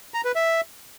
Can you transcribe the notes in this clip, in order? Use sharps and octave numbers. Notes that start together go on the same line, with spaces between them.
A#5
B4
E5